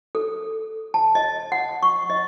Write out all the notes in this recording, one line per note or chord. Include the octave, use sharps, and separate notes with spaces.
A4
A5
D#5
F#5
C#6
D#5